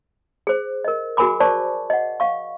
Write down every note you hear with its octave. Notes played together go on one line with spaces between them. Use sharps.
G#4 C5
A#4 D#5
F#4 G#4 A#4 G#5 B5 D6
C5 D5 A5 C#6 D6
D#5 F#5
F5 C#6